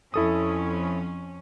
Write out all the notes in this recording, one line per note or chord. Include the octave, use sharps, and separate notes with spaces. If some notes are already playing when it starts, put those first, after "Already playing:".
F2 C#4 E4 A4 D#6